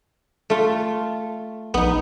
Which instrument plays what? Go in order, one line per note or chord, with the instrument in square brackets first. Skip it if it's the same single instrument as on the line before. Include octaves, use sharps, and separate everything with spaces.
[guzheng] A3 F4
[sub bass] A#1 [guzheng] B3 D#4